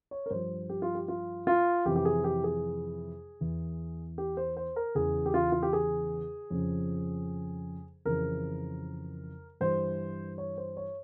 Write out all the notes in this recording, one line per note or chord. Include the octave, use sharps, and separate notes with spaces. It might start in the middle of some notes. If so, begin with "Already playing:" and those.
C#5
A#4
G2 F3 C5
G4
F4
G4
F4
F4
F2 C3 E3 G4
G4
G#4
G4
G#4
E2 E3
G4
C5
C5
A#4
E2 C#3 E3 G#4
G4
F4
F4
G4
G#4
F2 C#3 F3
F2 C#3 E3 A#4
G2 E3 C5
C#5
C5
C#5